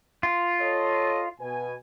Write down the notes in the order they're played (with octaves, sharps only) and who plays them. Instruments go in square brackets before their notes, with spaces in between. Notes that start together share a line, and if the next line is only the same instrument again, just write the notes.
[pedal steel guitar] F4
[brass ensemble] A4 C#5 D#5
B2 B4 G#5